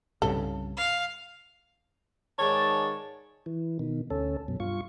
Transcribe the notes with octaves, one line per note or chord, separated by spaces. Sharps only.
C2 G2 C#3 A4
F5
G#2 D#3 G#4 C#5 D5 A5
E3
B2 D#3
D2 C#4 A4
F#2 B2
G2 F4 C#6